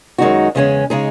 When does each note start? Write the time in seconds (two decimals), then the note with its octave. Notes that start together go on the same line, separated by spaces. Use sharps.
0.18 F#2 D#3 G#3 D#4 F#4
0.55 E2 C#3 G#3 C#4
0.90 C#3 G#3 D#4 G#4